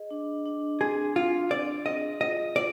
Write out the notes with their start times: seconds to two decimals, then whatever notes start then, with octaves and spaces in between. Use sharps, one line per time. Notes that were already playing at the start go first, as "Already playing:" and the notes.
Already playing: G#4 D#5
0.11 D4
0.46 D4
0.81 C4 G#4
1.16 C4 F4
1.51 D4 D5
1.86 G#4 D#5
2.21 F4 D#5
2.56 F4 D5